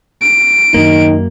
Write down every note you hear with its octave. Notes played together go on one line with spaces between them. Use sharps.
D7
F#2 D#3 A#3 D#4